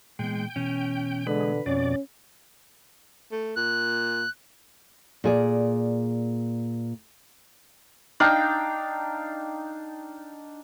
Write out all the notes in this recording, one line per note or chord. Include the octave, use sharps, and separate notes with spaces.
A#2 E3 G#3 B3 G5
B2 E3 C#4
D3 G#3 B4
F2 B2 C#4 D5
A3
A#2 F#6
A#2 G#4 D5
D4 D#4 F5 G5